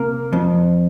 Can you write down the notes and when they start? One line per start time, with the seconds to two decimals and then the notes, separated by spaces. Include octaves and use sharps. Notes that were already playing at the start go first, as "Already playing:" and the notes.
Already playing: C3 A#3
0.33 F2